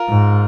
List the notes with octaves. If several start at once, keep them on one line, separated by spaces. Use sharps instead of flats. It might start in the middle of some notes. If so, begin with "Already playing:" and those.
Already playing: F4 A#4
G#2